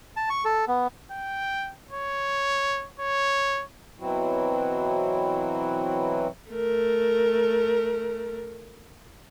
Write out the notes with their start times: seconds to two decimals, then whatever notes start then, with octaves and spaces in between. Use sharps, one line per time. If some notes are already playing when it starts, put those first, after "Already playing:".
0.16 A5
0.30 C#6
0.45 A4
0.68 B3
1.11 G5
1.91 C#5
2.99 C#5
3.99 B2 E3 F#3 C4 E4 F#4
6.51 A3 A#4